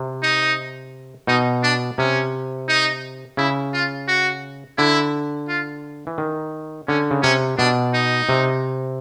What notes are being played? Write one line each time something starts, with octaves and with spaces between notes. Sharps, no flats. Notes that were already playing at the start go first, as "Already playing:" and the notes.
Already playing: C3
D#4
B2 D#4
D4
C3 C#4
D#4
C#3 E4
F4
F#4
D3 E4
F4
E3
D#3
D3 C#4
C#3
C3 C#4
B2 D4
D#4
C3